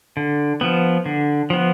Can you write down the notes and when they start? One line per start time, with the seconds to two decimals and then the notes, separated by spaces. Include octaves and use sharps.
0.17 D3
0.61 F3 B3
1.06 D3
1.50 F3 B3